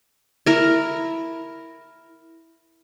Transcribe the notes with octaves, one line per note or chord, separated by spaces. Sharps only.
E4 A#4